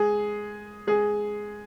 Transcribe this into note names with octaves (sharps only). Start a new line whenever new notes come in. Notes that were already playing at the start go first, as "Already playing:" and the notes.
Already playing: G#3 G#4
G#3 G#4